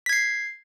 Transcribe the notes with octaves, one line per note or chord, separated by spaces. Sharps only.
G#6 B6 C7